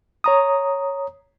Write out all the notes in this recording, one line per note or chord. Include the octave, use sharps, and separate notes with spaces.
C#5 A#5 D#6